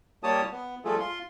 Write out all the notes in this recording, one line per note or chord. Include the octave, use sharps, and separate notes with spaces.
G3 A#3 G4 C#5 A5 D#6
B3
F3 G3 A3 F4 G#4 A4
F4 C6